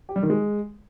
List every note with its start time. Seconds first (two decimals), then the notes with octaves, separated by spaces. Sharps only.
0.09 G4
0.16 G3
0.23 D#3
0.30 G#3